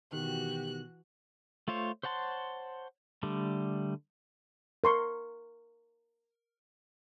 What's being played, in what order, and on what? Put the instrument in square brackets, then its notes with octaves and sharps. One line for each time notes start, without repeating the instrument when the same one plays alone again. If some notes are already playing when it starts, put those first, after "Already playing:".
[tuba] B2 [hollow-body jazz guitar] D#3 [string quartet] E3 F#4 F#6 [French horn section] G4
[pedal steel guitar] A3 F4 C5 C#5
C5 C#5 F#5 A5 C6
D3 G3 A3
[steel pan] A#4 C6 C#6